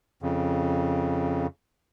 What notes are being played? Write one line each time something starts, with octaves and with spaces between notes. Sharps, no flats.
F2 C#3